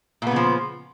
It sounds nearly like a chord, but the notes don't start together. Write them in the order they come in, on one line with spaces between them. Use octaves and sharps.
A#2 B3 C#3 F3